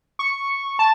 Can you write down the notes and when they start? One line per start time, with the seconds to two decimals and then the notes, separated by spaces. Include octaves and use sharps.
0.19 C#6
0.79 A5